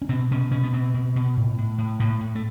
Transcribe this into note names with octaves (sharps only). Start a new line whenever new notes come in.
C#4
B2 C4
B2 C#4
B2 C#4
B3
B2 C4
B2
B2
A2
A2
A2
A2 A#3
A2
A3